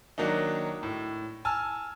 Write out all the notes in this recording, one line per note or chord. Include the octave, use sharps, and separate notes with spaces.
D#3 F#3 A#3 D4 D#4
A2
G#5 A5 E6 F6